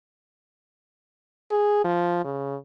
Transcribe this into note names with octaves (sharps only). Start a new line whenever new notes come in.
G#4
F3
C#3